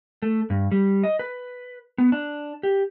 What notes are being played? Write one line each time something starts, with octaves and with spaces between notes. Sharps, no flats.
A3
G2
G3
D#5
B4
B3
D4
G4